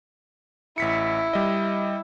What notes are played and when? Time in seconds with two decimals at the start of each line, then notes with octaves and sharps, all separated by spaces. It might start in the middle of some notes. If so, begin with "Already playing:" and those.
0.78 A1 E4 B6 C#7
1.33 G3 D#5